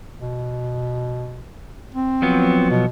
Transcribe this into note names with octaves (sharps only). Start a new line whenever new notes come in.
B2
C4
F3 F#3 B3
B2